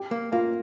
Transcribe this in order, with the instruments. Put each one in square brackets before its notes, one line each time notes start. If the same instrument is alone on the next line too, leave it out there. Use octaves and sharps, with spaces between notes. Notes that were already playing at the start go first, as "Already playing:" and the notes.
Already playing: [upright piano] G4 G5
[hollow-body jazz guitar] A#3
[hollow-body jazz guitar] A#3 [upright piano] F4 F5